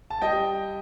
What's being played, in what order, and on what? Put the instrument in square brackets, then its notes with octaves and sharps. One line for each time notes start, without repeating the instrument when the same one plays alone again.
[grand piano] A5
G3 D#5 G5